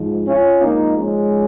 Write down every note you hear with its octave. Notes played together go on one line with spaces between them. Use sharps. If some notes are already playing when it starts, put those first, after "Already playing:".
Already playing: G#2 F3
C#4 F4
G#2 F3 A#3 D#4
G#3 C#4